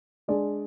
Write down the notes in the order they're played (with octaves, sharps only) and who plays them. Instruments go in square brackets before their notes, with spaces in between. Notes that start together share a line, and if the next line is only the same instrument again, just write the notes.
[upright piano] G#3 D4 G#4 D5